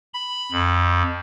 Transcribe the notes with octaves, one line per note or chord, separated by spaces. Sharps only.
B5
F2